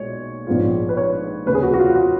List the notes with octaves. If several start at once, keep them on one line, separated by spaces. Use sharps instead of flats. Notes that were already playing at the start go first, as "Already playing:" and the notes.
Already playing: B1 A#2 G#3 C#5
A#1 G#2 F3 B3 F4
B4
C#5
F1 D#2 C#3 B4
G#4
F#4
F#4
F4
F#4